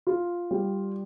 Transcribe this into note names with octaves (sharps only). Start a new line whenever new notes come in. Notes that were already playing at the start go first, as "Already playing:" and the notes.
F4
G3